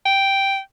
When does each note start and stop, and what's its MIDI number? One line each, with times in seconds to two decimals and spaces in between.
0.06 0.59 79